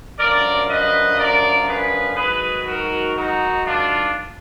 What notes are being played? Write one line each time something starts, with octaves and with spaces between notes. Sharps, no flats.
F#2 D3 F3 A#4 D5
B4 D#5
A#4 D5
G#4 B4
G#2 D#3 F#3 G#4 B4
F#4 A#4
D#4 F#4
D4 F4